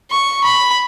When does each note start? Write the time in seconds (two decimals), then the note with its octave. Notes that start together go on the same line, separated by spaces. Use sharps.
0.10 C#6
0.44 B5